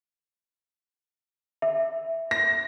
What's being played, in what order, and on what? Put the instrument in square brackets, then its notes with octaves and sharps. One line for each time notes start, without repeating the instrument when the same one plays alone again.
[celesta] E5
[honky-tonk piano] A#6